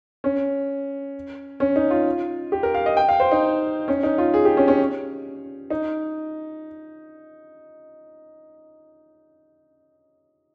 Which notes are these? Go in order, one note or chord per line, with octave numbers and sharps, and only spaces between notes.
C#4
C#4
D#4
F4
G4
A#4
F5
D#5
G5
F5
C5
D#4
C#4
D#4
F4
G#4
G4
C#4
C#4
D#4